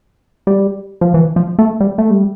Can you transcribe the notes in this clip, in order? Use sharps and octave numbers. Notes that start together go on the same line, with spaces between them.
G3
F3
E3
F3
A3
G3
A3
G3